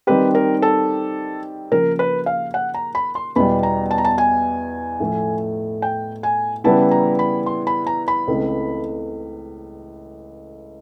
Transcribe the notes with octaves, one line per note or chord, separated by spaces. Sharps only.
D#3 G3 C4 D#4 G4 B4
A#4
A4
C#3 F3 A#3 A#4
B4
F5
F#5
A#5
B5
C6
E2 B2 G3 B5
A#5
A5
A#5
A5
G#5
A2 F3 A3
G5
G#5
C#3 E3 G3 B3 E4 A5
A#5
B5
C6
B5
A#5
B5
C#2 C#3 E3 A3 C4